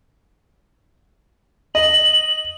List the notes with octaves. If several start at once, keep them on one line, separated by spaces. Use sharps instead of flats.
D#5 F#7